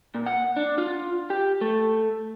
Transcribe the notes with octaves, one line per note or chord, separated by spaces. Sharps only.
A#2
F#5
D4
F4
G4
A3